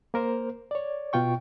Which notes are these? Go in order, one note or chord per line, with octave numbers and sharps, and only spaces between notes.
A#3 A#4 C5
C#5 D5
B2 F4 G5 C#6